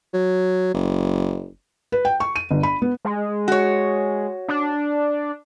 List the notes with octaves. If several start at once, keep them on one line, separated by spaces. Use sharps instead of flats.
F#3
F#1
B4
G5
C#6
D#7
G1
B5
B3
G#3
F#4 C#5
D4